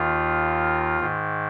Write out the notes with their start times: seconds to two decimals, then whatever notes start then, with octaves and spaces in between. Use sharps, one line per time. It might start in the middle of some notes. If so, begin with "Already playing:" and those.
Already playing: D#2 D#3 F4
1.00 G#2 D#3